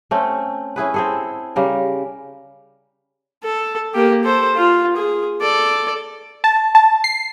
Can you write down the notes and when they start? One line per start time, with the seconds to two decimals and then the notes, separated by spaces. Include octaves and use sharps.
0.11 A3 C4 C#4
0.76 C#4 E4 G#4 B4
0.94 C4 G#4 A4
1.56 C#3 G3 A#4
3.44 A4
3.94 A#3 G4
4.24 A4 C5
4.56 F4
4.97 G#4
5.41 A4 D5
6.44 A5
6.75 A5
7.04 C7